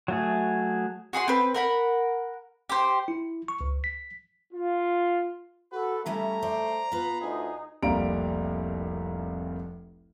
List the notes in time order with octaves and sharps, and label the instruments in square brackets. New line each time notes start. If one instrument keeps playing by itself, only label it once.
[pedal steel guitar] F#3 A3 G#4
[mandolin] F#4 G#4 F#5 C6
C4 B4
A#4 F#5 B5
G4 C5
[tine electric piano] E4
C#6
C#2
B6
[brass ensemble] F4
[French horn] F#4 [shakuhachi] A4 [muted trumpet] B4
[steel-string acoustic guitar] C#3 G3 C#4 [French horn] A3 [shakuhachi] E5 [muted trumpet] A#5
[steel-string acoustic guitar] C5 D5
[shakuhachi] B3 [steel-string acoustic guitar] F4 B4
[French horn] D2 [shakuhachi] D#4 [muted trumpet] G#4
[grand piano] F1 C2 G3 A#3 A#5 D7